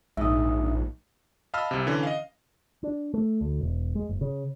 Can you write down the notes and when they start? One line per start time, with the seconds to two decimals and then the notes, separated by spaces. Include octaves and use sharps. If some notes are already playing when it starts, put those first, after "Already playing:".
0.17 A#1 G#2 E5 D#6
1.54 D#5 F5 A5 B5 E6 F6
1.71 C2 C3
1.87 D3 E3 C#4
2.03 D#5 F5
2.83 D4
3.14 A3
3.41 D2
3.61 E1
3.95 G#3
4.09 F#1
4.21 C#3